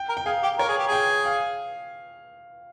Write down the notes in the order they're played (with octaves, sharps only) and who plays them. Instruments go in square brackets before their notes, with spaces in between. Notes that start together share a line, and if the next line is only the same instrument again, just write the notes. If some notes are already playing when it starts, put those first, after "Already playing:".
Already playing: [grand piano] G5
[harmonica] A#4
[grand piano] G5
[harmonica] G#4 [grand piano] F5
[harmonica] G4
[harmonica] A#4 [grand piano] C#5
[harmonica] G#4
G4
[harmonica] G#4 [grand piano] G5
[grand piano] F5